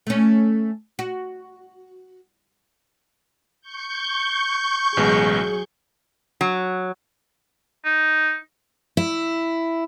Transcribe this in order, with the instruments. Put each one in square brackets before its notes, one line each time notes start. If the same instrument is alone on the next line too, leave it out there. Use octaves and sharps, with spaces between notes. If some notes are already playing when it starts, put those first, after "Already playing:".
[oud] A3 C#4
F#4
[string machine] C#6 G6
[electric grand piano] A1 B2 G#3 [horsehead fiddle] F#3 G#4
[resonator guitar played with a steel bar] F#3
[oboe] D#4
[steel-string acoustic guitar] E4